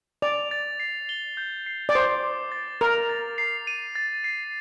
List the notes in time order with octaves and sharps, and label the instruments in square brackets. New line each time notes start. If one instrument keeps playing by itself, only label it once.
[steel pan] D5 [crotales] F7
[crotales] A6
C7
G7
G6
C7
[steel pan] D5
[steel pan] C5 [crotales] C7
[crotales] D6
A6
[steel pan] A#4 [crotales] F7
[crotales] A6
C7
D#7
A6
C7